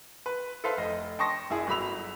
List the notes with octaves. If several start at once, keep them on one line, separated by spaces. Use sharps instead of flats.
B4
A4 B4 C5 E5 F5
F1 D#5
G5 A5 C6 C#6 D#6 A#6
F#1 E4 G#4
G1 F#3 B5 E6 F7